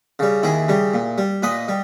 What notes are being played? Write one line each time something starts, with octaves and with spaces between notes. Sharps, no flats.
C#3 G3
D#2 E4 G#4
C#3 G3
A#2
G3
A#2 B4 D#5
G3